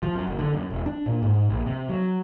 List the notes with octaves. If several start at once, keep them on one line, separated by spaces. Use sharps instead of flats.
F3
F#2
F#1
D3
F#2
E1
D4
A#2
G#2
A#1
C3
F#3